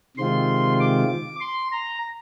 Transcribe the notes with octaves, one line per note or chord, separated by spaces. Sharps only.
C3 D#3 G#3 C4 F4 C6
D6
C6
A#5